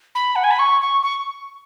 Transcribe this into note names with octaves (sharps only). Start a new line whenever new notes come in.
B5
F#5
G#5
B5
C#6
C#6
C#6